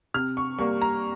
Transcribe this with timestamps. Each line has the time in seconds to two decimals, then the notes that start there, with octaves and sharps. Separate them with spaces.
0.14 C3 F6
0.37 C#6
0.58 G3 A#3 C#6
0.82 A#5